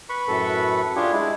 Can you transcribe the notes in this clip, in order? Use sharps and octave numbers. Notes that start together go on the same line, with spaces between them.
B4 B5 C#6
F#2 A2 A4
D4 F4 G4 G#4
G#3 E4